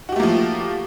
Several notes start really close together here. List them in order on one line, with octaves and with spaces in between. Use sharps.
F#4 G4 A3 A#3 F3